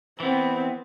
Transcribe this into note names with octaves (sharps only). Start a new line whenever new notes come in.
E3 B3 C4